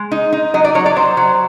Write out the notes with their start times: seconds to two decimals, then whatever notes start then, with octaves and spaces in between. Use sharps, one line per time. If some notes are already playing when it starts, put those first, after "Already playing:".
Already playing: G#3
0.12 D#4
0.33 D#4
0.54 F#3 D#5
0.64 D5
0.75 F#3 C#5
0.86 D5
0.96 F#3 C5
1.17 F#3